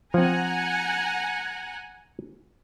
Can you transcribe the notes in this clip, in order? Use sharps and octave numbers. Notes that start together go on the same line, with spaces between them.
F3 C4 F#5 G#5 A#5